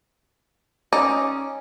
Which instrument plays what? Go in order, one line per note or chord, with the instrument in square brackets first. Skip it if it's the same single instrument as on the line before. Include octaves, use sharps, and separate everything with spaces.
[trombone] C#4 [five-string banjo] D#4 D5 D#5